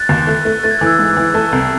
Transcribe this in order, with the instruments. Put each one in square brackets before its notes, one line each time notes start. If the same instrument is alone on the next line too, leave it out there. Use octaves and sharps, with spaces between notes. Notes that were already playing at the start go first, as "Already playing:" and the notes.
Already playing: [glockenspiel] F#6 A6
[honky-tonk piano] D#2
A3
A3
[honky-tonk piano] A3 [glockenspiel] A6
[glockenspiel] G#6
[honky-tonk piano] E3 [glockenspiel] F#6
[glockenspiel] E6 G#6
[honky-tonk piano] G#2
E3
[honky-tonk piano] A3 [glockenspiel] A5
[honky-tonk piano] C2